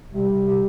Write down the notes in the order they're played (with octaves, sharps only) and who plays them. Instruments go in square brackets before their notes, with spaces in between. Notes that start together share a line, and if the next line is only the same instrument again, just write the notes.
[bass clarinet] C3 [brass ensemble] G3
[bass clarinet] C3
C3